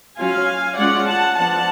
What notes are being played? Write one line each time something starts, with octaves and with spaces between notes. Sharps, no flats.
F#3 C#4 F4 F5 G#5
G#3 C#4 F4 D5 F#5
F#5 A5
F3 B3 D4 F#5 A5